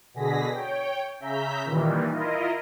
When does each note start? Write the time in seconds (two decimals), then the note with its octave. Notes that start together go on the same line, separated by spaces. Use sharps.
0.14 B2 D3 G#4 A#6 B6
0.52 C#5 G5
1.20 C#3 E5 A#5 G6 B6
1.65 A#2 D#3 E3 G3
2.10 E4 F4 A#4 D#5